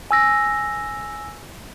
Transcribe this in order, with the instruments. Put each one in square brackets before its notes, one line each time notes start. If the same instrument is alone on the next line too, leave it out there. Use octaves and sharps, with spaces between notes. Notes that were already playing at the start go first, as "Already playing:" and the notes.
[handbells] G#5 E6 A#6